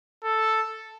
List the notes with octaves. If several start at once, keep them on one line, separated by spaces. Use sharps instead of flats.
A4